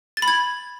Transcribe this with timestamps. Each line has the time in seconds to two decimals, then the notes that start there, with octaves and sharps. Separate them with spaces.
0.17 A6
0.22 B5
0.28 G#6